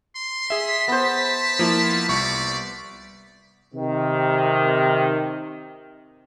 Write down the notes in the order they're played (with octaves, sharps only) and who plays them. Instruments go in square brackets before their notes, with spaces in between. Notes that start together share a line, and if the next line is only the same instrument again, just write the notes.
[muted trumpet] C6
[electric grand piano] G#4 E5 [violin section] B6
[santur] B3 C5 [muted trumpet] A5
[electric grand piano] F3 A#3 E4
[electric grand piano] C2 C#6 [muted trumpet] D5
[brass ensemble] C3 D#3